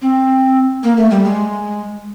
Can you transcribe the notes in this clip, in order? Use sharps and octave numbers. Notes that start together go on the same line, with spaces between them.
C4
A#3
A3
G3
G#3